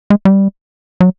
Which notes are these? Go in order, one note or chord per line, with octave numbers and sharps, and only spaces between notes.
G#3
G3
F#3